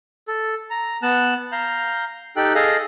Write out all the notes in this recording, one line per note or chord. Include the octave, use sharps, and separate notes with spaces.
A4
A#5
B3 A5 F#6
F5 A#5 G6
D#4 G4 A4 G5 F#6
G#4 A4 D#5 F5